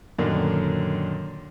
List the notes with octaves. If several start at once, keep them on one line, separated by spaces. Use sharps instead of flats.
F#2 A#2 D3 D#3